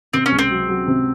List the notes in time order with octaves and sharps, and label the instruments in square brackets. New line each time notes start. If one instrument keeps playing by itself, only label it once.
[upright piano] C3 [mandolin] C4
[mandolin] C#4
[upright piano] C#2
[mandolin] C4
[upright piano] F#3
F#3
C3